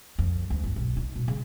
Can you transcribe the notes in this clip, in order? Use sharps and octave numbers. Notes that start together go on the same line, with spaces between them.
F2
D2
G1
B1
D#4
B2
C#3